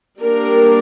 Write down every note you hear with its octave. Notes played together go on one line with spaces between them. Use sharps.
G3 A#3 D4 A#4